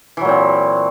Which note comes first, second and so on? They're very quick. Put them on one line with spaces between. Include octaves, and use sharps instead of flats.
E3 F#3 A#2 C4